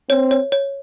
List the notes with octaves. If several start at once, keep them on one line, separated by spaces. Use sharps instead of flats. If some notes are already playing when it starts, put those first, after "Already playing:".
C4 C#5
C#5
C#5